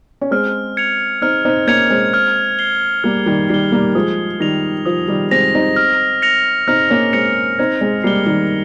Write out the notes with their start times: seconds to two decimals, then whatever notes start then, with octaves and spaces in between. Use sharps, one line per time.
0.21 C#4
0.31 G#3 C4 F6
0.77 G#6 C#7 F7
1.22 C4 D#4 F6
1.45 C4 D#4
1.67 A#3 C#4 G#6 C#7 F7
1.90 G#3 C4
2.14 F6
2.59 C7 G7
3.04 G3 A#3 F6
3.26 D#3 G3
3.50 D#3 G3 C7 G7
3.72 G3 A#3
3.95 F3 G#3 D#6
4.40 D#3 G3 A#6 F7
4.85 F3 D#6
5.08 D#3 G3
5.31 G#3 C4 A#6 F7
5.54 C4 D#4
5.76 F6
6.22 A#6 C#7 F7
6.68 C4 D#4 F6
6.90 A#3 C#4
7.13 G#3 C4 A#6 C#7 F7
7.59 C4 D#4 G#6
7.81 G#3 C4
8.04 G3 A#3 C7 G7
8.26 D#3 G3